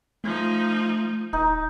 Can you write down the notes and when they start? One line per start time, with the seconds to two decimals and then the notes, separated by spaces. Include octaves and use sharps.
0.24 F3 A3 D#4
1.33 D#1 D#4